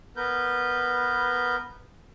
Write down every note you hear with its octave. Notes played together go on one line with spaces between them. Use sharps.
B3 A#4 B4 G6